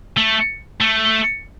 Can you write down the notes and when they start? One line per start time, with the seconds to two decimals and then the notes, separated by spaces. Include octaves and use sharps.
0.17 A3
0.81 A3